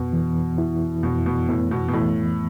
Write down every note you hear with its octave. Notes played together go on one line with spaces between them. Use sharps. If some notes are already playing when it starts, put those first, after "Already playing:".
Already playing: F2 B2 B3
E3
E4
F2 B2
B2
A2 B3
B2
B2
A2 E3